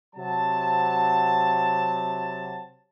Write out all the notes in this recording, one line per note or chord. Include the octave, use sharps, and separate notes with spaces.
C3 F#3 A5